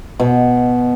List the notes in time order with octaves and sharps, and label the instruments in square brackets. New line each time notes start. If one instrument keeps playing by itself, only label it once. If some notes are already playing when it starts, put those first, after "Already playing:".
[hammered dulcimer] B2